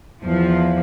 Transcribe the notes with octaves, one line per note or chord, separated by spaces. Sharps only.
E2 F3